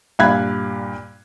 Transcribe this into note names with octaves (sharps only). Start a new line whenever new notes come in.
G2 A#2 F5 B5 F#6 G#6